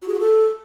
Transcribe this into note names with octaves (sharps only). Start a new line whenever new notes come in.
F#4
G#4
F#4
A4